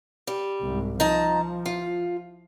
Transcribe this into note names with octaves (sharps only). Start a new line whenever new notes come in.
G3
C2 G#2
F3 D#4 A5 A#5
F4